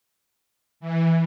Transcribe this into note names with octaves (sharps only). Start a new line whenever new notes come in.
E3